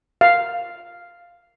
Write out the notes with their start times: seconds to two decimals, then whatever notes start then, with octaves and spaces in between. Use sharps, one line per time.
0.21 F5